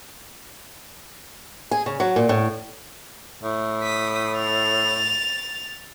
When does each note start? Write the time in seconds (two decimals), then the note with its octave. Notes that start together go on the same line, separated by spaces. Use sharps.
1.71 G#4
1.86 C#3
2.00 F#3
2.16 A#2
2.29 A2
3.43 A2
3.82 D#6 B6
4.37 A6 F7